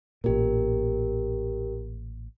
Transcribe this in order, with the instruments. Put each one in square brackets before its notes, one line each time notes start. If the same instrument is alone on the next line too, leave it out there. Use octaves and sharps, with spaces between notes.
[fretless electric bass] A1 A#2 [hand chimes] G4 A#4